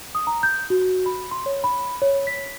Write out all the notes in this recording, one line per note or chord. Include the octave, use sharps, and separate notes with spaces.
D#6
A#5
G6
F#4
B5
C6
C#5
B5
C#5
B6